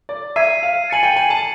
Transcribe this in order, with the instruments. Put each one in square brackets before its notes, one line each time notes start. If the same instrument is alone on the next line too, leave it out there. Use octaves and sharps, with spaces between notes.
[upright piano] D5
[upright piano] E5 [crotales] G#6 C7 D#7
[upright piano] F5
[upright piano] G#5 [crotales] A6 C#7 F#7
[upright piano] G5
G#5
A5